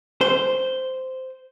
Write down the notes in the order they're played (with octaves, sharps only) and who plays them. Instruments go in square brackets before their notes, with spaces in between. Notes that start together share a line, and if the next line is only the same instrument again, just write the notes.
[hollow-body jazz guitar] C5